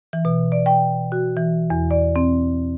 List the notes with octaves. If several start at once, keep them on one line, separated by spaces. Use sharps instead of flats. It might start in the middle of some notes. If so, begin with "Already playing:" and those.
E3
B2
D5
G5
F#4
E3
E2
D5
C4